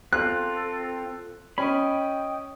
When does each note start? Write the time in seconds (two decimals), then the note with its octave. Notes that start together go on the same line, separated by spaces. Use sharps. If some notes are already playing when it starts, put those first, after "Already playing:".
0.13 C4 F4 A4 F#6
1.58 C#4 D#5 G5 B5